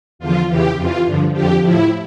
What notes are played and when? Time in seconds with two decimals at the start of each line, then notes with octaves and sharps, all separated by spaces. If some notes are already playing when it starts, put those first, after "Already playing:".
0.19 E2 D3 F3 F4
0.48 E2 C#3 E3 G4
0.76 F2 E3 F4
1.05 G2 D3 F3
1.33 F2 D3 F3 G4
1.62 A2 F3 E4